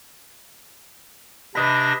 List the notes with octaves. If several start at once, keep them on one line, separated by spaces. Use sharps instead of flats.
C3 D4 B4 D#5 B5 A#6